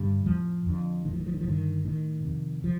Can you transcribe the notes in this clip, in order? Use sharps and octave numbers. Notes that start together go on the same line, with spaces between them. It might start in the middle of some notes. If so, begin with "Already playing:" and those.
Already playing: G2 D3 G3
F2 A2 F3
F2 D3
A2 D#3
F3
D#3
F3
D#3
F3
G2 D3 D#3
A2 D#3
F2 C3
F3